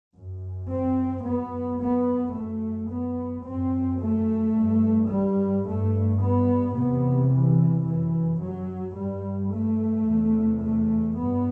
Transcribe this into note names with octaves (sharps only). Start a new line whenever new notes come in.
F#2
C4
F#2 B3
B3
F#2 A3
B3
F#2 C4
A3
G2
G3
G2 A3
B3
E2 C3 B3
E3
F#2 E3
F#3
G2 G3
A3
E2 C3
A3
G2 B3